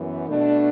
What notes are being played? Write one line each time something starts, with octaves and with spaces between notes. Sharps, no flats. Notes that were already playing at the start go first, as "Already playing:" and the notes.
Already playing: F#2 E3 B3
B2 A3 D4